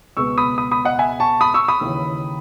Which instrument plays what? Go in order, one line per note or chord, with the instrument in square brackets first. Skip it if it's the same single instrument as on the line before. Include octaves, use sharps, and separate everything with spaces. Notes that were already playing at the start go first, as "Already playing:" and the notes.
[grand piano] C#2 B2 G#3 B3 C#6 E6
B5 D#6
B5 D#6
B5 D#6
D#5 F#5
E5 G#5
A5 C#6
B5 D#6
C#6 E6
B5 D#6
D#2 C#3 E3